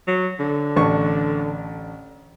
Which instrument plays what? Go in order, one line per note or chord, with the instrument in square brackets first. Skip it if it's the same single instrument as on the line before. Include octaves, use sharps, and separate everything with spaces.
[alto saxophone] F#3
D3
[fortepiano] A1 D4 C#6